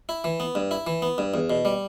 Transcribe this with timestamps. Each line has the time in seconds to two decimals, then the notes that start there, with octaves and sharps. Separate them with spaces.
0.09 E4
0.24 E3
0.40 B3
0.55 G2
0.71 E4
0.87 E3
1.02 B3
1.18 G2
1.34 E2
1.50 B2
1.65 G3